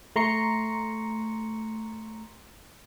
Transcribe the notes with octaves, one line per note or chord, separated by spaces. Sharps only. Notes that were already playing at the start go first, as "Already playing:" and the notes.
A3 A#5 C6 C#6 C#7